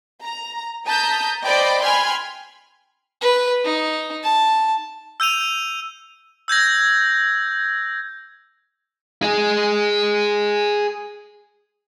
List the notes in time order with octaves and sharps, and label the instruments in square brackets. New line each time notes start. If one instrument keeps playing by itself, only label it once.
[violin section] A#5
A5 A#5 D#6 G6 B6
C5 D5 D#5 G5 B5 D6
G5 G#5 B5 C6 F6 G#6
[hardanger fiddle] B4
D#4
A5
[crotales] E6 G6 D#7 F7
E6 G6 G#6 A#6
[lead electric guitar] G#4 D#5